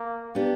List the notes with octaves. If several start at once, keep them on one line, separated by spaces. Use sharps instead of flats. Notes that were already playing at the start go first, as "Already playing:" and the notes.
Already playing: A#3
B3 D4 G4